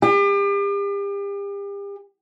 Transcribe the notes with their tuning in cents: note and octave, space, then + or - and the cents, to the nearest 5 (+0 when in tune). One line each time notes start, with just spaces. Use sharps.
G4 +40